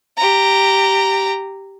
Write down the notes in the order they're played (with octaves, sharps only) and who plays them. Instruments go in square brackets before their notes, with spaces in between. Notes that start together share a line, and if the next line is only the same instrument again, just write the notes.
[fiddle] G4 A#5